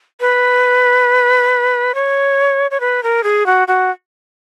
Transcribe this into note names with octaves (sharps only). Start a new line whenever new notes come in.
B4
C#5
C#5
B4
A#4
G#4
F#4
F#4